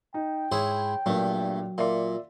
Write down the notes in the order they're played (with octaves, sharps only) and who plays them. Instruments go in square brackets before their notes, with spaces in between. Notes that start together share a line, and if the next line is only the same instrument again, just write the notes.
[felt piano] D#4 [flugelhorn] G5
[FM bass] G#2 [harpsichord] E4 G#4 C5 [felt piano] C#5
[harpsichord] G2 A3 [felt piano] A#2 D4 [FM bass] F#3
[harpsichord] A#2 [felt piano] D5 E5 C6